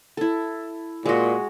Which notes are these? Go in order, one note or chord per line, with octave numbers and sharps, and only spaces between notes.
E4 A4
A#2 G#3 F#4